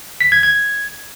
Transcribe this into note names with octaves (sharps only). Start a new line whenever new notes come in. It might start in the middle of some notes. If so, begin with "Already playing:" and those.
B6
G#6
G#6